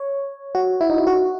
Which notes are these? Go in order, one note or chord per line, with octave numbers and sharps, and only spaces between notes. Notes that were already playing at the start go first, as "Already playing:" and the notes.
Already playing: C#5
F#4
E4
D#4
E4
F#4